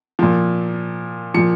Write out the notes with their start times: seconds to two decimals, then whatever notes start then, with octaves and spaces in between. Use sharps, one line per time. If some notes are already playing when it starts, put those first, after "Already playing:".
0.19 A#2 F3
1.34 A#2 F3 C#7